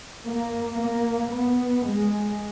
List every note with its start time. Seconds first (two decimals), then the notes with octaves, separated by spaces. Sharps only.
0.25 A#3
0.77 A#3
1.31 B3
1.84 G#3